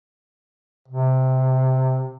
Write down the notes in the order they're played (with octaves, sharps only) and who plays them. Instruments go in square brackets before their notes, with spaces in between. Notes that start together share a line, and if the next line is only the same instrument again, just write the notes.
[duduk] C3